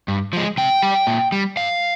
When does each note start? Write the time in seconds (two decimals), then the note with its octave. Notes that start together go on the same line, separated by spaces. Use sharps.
0.08 G2
0.33 F3 G#3
0.58 C3 G5
0.82 G3
1.07 A#2
1.32 G3
1.57 G2 F5